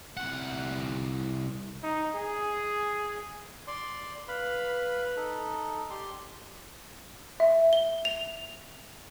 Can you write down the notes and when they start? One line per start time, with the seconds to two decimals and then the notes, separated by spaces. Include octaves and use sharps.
0.17 C2 F#5
1.83 D#4
2.15 G#4
3.67 D5 C6
4.28 B4 F5 B5
5.17 D#4 A4
5.90 G4 D5 C6
7.40 E5
7.73 G7
8.05 F7